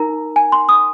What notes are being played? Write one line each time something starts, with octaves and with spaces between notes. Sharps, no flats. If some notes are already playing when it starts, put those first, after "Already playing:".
Already playing: D#4 A#4 A#5
G#5
C6
D#6